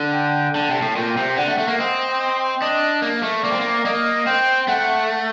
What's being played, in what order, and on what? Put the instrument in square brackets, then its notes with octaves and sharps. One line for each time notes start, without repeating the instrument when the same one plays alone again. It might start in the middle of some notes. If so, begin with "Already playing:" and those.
Already playing: [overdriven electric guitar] D3
[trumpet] G5
[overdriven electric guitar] D3 [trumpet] A5
[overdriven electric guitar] C3
A2
[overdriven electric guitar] A#2 [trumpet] G5
[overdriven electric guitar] C3
[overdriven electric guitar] D3 [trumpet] F#5
[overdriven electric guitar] A3
A3
A#3
[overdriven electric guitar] C4 [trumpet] D#5
[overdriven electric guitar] D4 [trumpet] D#5
[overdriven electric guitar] A#3
A3
[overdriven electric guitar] A#3 [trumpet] D5
[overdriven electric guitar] C4
A#3
[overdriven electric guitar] A#3 [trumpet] D#5
[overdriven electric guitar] C4 [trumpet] G5
[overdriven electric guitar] A3 [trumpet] F#5